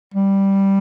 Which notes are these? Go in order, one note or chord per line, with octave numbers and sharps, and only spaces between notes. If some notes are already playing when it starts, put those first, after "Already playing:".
G3